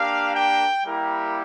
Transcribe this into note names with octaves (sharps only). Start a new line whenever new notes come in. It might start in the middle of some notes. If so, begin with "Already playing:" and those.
Already playing: A#3 D4 G4 F5
G5
G3 A#3 E4 G4 A#4